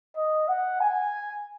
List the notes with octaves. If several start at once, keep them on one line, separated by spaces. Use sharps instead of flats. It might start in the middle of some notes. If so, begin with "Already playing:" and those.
D#5
F#5
G#5